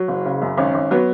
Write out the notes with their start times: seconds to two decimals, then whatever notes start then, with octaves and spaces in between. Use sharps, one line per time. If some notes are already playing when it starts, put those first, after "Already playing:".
Already playing: F#3
0.08 F#1
0.25 C#3
0.42 F#2
0.58 G#1 C#4
0.74 G#1
0.91 F#3 B3